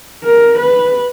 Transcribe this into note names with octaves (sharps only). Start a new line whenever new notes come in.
A#4
B4